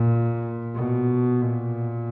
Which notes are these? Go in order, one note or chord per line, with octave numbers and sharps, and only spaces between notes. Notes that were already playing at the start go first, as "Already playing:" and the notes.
Already playing: A#2
B2
A#2